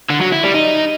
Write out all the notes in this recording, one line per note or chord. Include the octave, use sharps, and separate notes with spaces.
D3
F#3
E4
G3
D#4